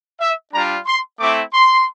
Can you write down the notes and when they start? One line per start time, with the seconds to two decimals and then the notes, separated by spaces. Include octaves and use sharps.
0.21 E5
0.54 G3 D4 F4 A#5
0.86 C6
1.19 A3 C4 E4 D6
1.54 C6